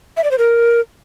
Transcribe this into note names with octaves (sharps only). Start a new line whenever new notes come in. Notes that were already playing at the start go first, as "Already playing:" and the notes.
E5
D5
C5
A#4